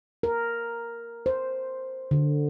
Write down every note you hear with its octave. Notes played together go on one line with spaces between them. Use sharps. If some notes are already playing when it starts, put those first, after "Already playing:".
A#4
C5
D3